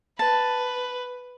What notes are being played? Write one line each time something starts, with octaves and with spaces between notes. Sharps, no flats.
B4 A5